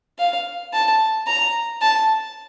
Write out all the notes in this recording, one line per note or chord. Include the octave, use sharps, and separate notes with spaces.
F5
A5
A#5
A5